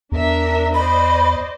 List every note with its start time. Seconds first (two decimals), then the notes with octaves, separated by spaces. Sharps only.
0.12 E2 D4 A#4 E5
0.74 C5 D5 D#5 B5